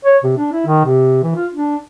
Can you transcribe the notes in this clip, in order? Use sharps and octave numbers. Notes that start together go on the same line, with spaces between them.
C#5
C3
D4
E4
D#3
C3
E3
F4
D4